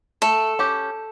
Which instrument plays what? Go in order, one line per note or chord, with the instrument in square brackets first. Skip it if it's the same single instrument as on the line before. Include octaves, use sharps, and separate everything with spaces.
[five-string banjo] A3 [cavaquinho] A4
[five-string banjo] C#4 G4